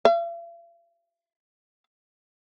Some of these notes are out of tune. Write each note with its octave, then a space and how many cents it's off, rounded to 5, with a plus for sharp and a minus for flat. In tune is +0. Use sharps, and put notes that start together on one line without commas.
F5 -45